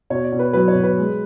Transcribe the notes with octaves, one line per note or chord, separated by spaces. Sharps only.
B2 C#5
D5
B2
B4
F#3 B4
C#5
B2
B4
G#3